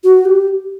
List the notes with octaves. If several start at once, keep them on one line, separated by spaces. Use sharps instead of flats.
F#4
G4